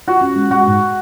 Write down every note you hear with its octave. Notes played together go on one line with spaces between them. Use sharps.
F4 F#4
C#4
G#3
G#3 F#4
G#2